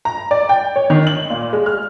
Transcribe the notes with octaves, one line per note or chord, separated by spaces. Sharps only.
A#5
D5
G5
C#5
D#3
F#7
A#2
G#3
F6